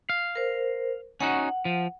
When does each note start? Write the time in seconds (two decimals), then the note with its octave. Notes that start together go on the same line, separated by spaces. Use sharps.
0.10 F5
0.35 A#4 C5
1.21 C#4 D#4 F#4 F#5
1.65 F3